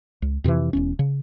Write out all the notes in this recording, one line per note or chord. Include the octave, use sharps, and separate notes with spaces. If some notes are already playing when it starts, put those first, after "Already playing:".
C#2
F2 C3 D#3 E3
E1 E2 C#4
C#3